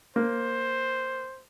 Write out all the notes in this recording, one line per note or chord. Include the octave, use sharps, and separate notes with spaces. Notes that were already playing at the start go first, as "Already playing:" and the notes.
A#3 C5